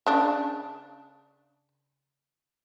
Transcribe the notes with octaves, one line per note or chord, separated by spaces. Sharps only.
C#3 D4